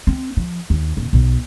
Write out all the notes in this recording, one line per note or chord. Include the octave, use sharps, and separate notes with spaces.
C4
F3
D#2
D#1
B1